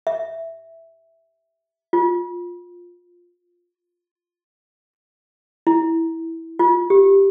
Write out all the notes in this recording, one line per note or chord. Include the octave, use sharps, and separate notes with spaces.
E5
F4
E4
F4
G4